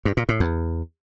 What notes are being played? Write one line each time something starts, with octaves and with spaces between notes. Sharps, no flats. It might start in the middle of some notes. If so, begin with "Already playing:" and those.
G2
A#2
A2
E2